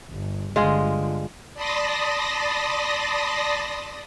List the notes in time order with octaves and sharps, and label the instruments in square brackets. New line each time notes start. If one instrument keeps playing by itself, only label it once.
[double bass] G1
[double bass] G1 D3 [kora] G#3 F4 G#4
[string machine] D5 A5 B5 C6 D#6 A#6